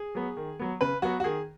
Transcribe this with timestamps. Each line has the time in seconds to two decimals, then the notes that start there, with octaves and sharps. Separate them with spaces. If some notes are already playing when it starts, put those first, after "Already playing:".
Already playing: G#4
0.15 F#3 B3
0.37 D#3
0.59 F#3 B3
0.81 C#3 B4
1.02 F#3 B3 F#4
1.20 F#4
1.24 D#3 G#4